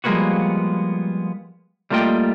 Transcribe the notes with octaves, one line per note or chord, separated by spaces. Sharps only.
F3 G3 G#3 A#3 B3 F#4
G3 A3 A#3 F4 D#5 G5